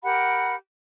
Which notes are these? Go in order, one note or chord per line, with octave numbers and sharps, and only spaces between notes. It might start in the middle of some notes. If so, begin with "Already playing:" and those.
G4 A#4 F#5 B5